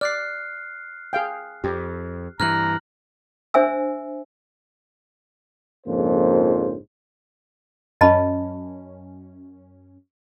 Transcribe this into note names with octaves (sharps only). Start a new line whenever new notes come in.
D5 F6 F#6 C7
G#4 F5 G5
F2 G4
G2 E3 A#5 F6 F#6 F#7
D4 C5 E5 G#5 E6
A#1 F2 G#2 C#3 A#3 C5
F#2 C#4 D#5 A5 B5